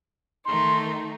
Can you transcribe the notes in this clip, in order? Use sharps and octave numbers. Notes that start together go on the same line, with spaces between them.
D#3 A3 D#4 C6